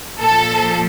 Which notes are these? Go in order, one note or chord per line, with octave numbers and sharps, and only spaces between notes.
A#2 F3 A4